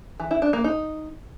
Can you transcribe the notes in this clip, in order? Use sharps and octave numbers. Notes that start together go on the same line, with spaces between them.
E3
E4
D4
A#3
D#4